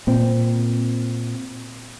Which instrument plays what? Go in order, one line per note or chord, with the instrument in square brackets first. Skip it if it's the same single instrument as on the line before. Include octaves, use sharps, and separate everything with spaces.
[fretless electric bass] A#2 C4